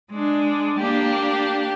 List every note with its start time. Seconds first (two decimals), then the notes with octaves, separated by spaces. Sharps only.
0.12 G#3 D4
0.78 A#3 D4 G4